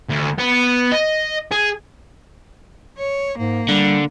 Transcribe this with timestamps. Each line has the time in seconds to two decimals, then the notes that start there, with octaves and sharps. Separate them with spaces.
0.09 D2
0.38 B3
0.92 D#5
1.51 G#4
2.98 C#5
3.38 G#2 A#3
3.68 D3 G3